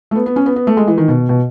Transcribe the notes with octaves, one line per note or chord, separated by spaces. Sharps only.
A3
B3
B3
C#4
B3
B3
A3
G#3
E3
D#3
B2
B2